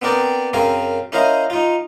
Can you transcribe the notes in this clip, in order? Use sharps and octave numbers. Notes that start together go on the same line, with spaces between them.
B3 C4 D4 A#4 D5 G5
F#2 C#3 C4 A#4 F5 G#5
C#4 E4 A#4 C5 D#5 F5
D#4 F4